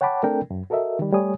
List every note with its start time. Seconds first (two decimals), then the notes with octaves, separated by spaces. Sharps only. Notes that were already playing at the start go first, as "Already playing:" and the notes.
0.01 C#5 F#5 G5 A5 B5 D6
0.23 A3 C4 D4 A4 A#4 G5
0.50 F#2
0.70 F#4 A4 A#4 D#5 E5
0.99 D#3 G3
1.13 G3 A3 C#5 G#5 D#6